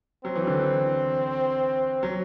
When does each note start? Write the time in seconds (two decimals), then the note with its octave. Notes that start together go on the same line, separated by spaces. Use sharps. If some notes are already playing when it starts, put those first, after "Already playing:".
0.25 F#3 C4
0.35 E3
0.47 D3
0.59 E3
2.03 F#3